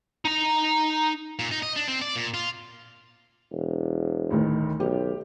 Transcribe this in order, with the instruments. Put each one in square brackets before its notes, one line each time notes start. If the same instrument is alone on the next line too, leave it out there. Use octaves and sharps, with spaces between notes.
[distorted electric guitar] D#4 A#5
A#2
D#4
D#5
D4
C4
D5
A#2
F4
[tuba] E1
[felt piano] D2 A2 D#3
[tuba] B1 [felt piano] G4